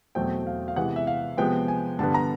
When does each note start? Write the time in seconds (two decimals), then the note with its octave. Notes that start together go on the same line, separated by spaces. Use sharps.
0.15 E2 B2 F#3 A3 C4 G5
0.47 F5
0.68 F5
0.76 C3 E3 G#3 B3 F#5
0.96 E5
1.07 F5
1.37 C3 F3 G#3 B3 G5
1.68 G#5
1.99 G2 D3 G3 B3 A5
2.14 A#5